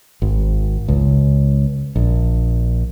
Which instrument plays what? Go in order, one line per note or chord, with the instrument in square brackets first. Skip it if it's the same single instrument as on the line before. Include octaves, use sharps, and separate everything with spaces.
[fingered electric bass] G#1
C#2
A#1